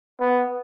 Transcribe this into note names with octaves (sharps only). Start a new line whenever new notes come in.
B3